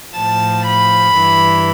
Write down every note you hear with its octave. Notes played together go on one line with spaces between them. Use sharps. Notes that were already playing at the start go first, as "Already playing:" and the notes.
A2 F3 A5
B5
G2 E3